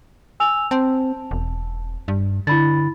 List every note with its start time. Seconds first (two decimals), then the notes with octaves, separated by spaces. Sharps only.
0.40 G#5 E6 F7
0.71 C4 A5
1.31 E1
2.08 G2
2.47 D3 E4 B5 A6